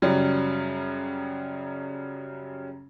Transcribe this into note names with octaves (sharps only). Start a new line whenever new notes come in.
F#2 C#3 F#3 G3